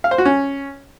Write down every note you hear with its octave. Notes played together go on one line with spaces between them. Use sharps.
F5
C5
F#4
C#4